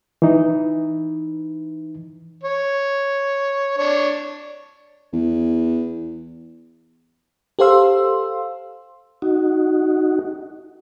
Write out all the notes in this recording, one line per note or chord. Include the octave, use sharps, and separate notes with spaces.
E3 D#4
C#5
D4 C#5
E2
G4 A4 C5 F5 C6 E6
D#4 F#4